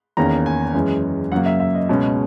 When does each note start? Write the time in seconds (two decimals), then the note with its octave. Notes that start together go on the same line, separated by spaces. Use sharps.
0.17 E2 D#3 A#3 C#4 A#5
0.46 G#5
0.74 F#2 E3 G#3 C#4
1.32 F#2 C#3 F#3 A#3 F#5
1.46 E5
1.60 E5
1.75 D#5
1.89 C#2 B2 G#3 C#4